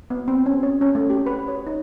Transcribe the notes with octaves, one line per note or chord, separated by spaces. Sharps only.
B3
C4
C#4
C#5
C#4
A3
G4
B4
C#5
D#4